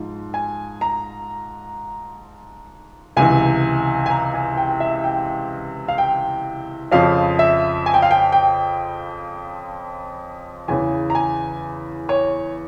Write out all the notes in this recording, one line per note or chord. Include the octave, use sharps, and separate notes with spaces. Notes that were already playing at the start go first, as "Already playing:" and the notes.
Already playing: G#2 F3
G#5
A#5
C#2 C3 E3 G#5
G#5
A#5
G#5
G5
E5
G5
F5
G5
F2 C#3 F3 F5
E5
G#5
G5
F5
G5
G5
E2 C#3 E3 G#5
A#5
G#5
C#5